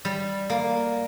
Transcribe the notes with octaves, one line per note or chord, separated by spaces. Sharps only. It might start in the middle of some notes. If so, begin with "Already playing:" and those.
G3
A#3